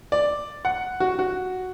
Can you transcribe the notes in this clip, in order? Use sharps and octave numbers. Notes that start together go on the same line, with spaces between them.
D5
F#5
F#4
F#4